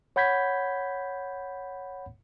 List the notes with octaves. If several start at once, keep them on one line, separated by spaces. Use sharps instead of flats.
C#5 F#5 B5 G6 G#6 B6